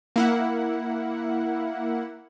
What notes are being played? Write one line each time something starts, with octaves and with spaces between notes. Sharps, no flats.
A#3 E4 F#5